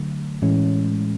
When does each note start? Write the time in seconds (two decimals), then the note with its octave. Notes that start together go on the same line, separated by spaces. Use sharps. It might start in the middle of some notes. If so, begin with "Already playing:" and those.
Already playing: D3 F#3 A3
0.42 A2 E3 G#3 C#4